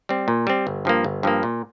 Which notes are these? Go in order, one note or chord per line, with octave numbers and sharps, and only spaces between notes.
G3 C4
A#2
G3 C4
G1
G2 F3 A#3
G1
G2 F3 A#3
A#2